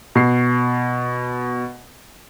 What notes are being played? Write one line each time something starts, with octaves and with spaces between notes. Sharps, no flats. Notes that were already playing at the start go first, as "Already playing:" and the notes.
B2 C7